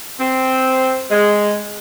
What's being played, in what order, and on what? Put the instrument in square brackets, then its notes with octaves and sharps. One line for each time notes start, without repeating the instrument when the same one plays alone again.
[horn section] C4
G#3